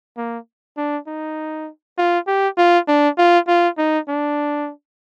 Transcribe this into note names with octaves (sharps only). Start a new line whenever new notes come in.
A#3
D4
D#4
F4
G4
F4
D4
F4
F4
D#4
D4